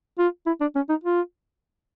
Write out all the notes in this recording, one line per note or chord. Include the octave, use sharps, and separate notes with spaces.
F4
E4
D4
C#4
D#4
F4